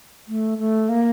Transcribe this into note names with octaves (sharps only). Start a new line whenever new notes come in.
A3
A3
A#3